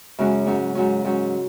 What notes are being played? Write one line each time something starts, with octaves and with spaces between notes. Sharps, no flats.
F#2 C#3 G#3 C#4 F#4
G#2 F#3 C#4
G#2 F#3 C#4
G#2 F#3 C#4